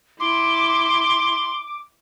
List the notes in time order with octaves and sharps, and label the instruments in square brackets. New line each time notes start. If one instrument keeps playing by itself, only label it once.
[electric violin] E4 [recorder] C6 [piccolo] D6